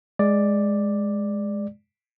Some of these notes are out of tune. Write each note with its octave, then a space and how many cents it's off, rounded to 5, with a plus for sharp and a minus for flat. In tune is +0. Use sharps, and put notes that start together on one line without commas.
G#3 +0 D5 +5